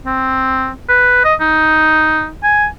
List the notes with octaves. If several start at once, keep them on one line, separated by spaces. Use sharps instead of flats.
C4
B4
D#5
D#4
G#5